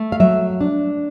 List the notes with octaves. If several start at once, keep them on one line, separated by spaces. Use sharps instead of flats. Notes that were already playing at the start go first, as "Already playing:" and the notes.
Already playing: A3
F5
F#3 E5
D4